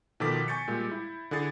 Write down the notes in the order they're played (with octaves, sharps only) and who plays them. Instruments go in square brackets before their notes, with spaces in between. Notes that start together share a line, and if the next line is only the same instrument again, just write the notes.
[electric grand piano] B2 D#3 F3 A4 D6 B6
G#5 C#6 G6 A6 C#7
A#2 G3 G#3
E4
D3 E4 G#4 A6 C7